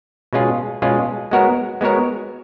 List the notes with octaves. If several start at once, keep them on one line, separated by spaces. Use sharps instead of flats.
B2 G#3 C#4 F4 G#4
B2 G#3 C#4 F4 G#4
G#3 B3 F#4 A#4 C#5
G#3 B3 F#4 A#4 C#5